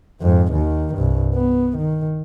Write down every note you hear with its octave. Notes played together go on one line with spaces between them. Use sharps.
F2 G#2
D#2 D#3
C2 G2
B3
D#3